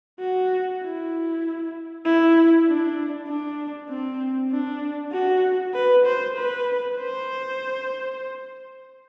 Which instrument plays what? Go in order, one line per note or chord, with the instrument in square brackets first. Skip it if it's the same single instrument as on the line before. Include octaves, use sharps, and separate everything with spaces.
[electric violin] F#4
E4
E4
D4
D4
C4
D4
F#4
B4
C5
B4
C5